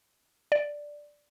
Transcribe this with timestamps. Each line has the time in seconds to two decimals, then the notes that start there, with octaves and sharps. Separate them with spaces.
0.52 D5